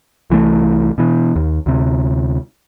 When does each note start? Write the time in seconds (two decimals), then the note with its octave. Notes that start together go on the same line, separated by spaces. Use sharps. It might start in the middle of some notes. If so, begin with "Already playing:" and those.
0.30 C2 E3 F#3 A3
0.98 B2 E3
1.36 D#2
1.66 D2 C3